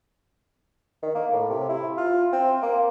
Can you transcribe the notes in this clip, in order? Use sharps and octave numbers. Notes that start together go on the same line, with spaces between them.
D#3
A#3
A2
C3
E4
F4
C4
A#3